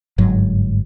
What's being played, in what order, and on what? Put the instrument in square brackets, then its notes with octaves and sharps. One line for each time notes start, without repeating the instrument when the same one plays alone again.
[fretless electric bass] G1 G#2 F#3